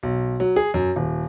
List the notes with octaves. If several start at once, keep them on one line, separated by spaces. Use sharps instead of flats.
B1
F#3
G#4
F#2
D#1